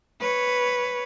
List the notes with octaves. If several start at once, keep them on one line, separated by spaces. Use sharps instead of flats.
B4 C#5